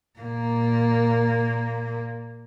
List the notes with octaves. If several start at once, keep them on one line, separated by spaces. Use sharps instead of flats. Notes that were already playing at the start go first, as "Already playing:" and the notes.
A#2 A#3